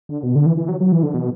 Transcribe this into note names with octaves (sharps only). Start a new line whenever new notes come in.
D3
B2
D3
E3
E3
F#3
F#3
E3
D3
B2